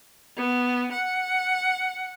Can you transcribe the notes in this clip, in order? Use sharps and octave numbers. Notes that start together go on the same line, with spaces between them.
B3
F#5